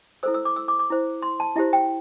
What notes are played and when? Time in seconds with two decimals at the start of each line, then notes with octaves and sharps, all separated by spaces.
0.23 E4 A4 C5 E6
0.34 E6
0.45 D6
0.56 E6
0.68 D6
0.79 D6
0.90 E4 C5
1.22 C6
1.40 A5
1.56 E4 G4 C5 E5
1.73 G5